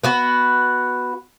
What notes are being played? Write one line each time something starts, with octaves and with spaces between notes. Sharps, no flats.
B3 F#4 B4